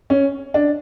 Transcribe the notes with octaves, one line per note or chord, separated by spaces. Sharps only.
C#4
D4